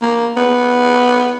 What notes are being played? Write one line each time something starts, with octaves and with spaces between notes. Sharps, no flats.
A#3
B3